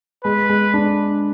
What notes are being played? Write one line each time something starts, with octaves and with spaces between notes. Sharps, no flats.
G#3 B4
G#3
D4